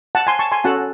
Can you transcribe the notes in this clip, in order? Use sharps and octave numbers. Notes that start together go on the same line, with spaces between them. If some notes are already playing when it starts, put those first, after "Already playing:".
F#5 A5
G#5 C6
A5 C#6
G#5 C6
C#4 F#4 A4 F#5 A5